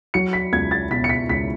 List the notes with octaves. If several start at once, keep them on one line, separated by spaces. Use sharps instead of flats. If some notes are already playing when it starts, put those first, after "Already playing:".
F#3 C#7
B6
C#2 G#6
A6
B2 B6
C#7
B6
C#2 B6